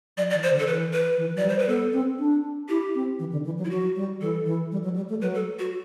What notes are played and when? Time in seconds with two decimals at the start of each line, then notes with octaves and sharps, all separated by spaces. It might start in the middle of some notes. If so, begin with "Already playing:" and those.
0.17 F#3 D5
0.30 D5
0.34 E3
0.43 C5
0.50 D3
0.59 A4
0.67 E3 B4
0.93 B4
1.18 E3
1.35 F#3 D5
1.43 G3
1.49 C5
1.58 B4
1.68 B3 A4
1.93 C4
2.19 D4
2.69 E4 G4
2.95 C4
3.19 E3
3.32 D3
3.45 E3
3.58 F#3
3.65 E4
3.70 F#3 F#4
3.96 G3
4.21 E3 A4
4.45 E3
4.72 G3
4.84 F#3
4.96 G3
5.09 A3
5.21 F#3 B4
5.35 A4
5.59 F#4